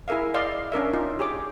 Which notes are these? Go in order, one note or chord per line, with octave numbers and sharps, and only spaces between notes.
E4 G#4 A#4 E5 F5
D5 D#5 F5 C6
C#4 D4 A#4 E5
D#4 F4
G4 G#4 C#5 D6